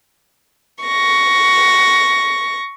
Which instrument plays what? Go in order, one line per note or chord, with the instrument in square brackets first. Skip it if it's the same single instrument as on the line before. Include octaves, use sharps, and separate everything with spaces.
[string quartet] C#6 A#6